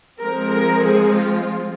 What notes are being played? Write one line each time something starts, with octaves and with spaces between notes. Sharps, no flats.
F3 G#3 C4 A#4
A#4
G#4
F4